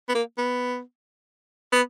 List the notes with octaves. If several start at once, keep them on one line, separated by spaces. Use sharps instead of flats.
B3
A#3
B3
B3